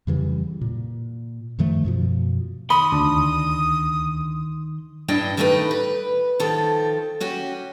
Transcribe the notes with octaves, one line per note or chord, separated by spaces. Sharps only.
F2 C#3 E3 G3
A#2
F#2 D#3 F3 A3
F#2 B2 F3
D#3 B5 C6 D#6
D2 D4
G2 D4 E4 D5 D#5 G5
D#3 G3 A3 D#4 F#4 B4
B4
D#3 F3 A4
C#4 F#4 G4